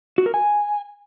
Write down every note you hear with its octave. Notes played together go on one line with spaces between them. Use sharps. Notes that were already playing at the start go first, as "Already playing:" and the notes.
F#4
A#4
G#5